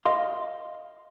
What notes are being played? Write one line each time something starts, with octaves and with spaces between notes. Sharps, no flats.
D#5 F5 C6